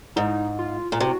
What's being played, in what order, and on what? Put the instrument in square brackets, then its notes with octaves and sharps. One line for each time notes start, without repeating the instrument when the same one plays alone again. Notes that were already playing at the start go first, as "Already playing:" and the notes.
[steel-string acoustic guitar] G#2 [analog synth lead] D#4
[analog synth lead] F4
[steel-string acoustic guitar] A#2
[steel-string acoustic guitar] C3 [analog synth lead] F#4